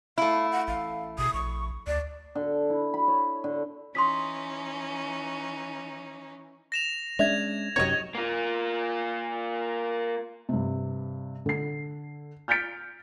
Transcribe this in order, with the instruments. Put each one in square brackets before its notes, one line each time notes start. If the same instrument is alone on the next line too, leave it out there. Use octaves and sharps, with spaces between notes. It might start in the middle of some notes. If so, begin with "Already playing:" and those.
[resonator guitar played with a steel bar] A3 E4 [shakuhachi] F5
[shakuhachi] F#5
[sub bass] A1 [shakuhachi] F5
[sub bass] B2 [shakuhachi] D#6
[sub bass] A#1 [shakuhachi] C#6
[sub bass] D2 [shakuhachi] D5
[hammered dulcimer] D3
E4
B5
C#5
D3
[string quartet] E3 C#4 D#4 [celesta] C6 D#6 B6
[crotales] A#6 E7 F7
[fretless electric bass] G#3 C#4 [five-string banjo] D4 E5 [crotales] G#6 F7
[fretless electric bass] F#2 C3 C4 [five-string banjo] D#4 F#4 G4 [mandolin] C#5 D#5
[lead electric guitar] A#3 F4
[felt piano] G2 C3
D3 C7
F6 G6 A6 B6 D7